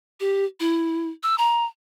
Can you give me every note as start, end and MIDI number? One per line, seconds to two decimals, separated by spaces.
0.20 0.45 67
0.60 1.08 64
1.23 1.36 88
1.38 1.65 82